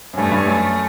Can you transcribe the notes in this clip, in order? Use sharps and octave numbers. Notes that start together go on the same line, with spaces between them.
F#2
G2 A3
G2
F#2 A3